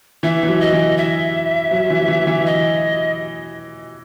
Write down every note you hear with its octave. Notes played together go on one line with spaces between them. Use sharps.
E3 E5
E3
F#3
D#5
E3
E5
F#3
E3
F#3
E3
E3
D#5